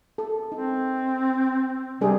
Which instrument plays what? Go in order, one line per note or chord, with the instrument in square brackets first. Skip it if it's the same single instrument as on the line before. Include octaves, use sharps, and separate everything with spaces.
[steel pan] A4
[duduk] C4 [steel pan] D#4
[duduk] C3 [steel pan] G3 D4 G#4